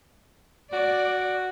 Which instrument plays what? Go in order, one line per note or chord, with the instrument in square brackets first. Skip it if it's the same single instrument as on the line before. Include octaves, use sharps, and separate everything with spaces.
[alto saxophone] F#4 [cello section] D5